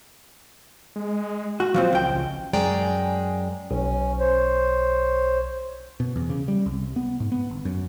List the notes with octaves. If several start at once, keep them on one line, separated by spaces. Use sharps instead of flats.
G#3
F#4
F3 F#3 C4 F4
C#2 G5
A1
F#2 G#3 D5 G5 A#5
B1 C#4
C5 C#5
B2
E2
C#3
G3
C2
B3
G#2
B3
G1
F#2